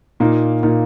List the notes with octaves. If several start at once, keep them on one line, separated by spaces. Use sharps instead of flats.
A#2 A#3 D#4
A#2 A#3 D#4